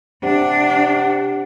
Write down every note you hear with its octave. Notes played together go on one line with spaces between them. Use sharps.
C3 D4 F#5